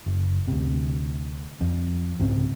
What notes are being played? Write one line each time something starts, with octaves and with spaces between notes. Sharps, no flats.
F#1
D2 C3
F2
C2 G#2 C#3 C4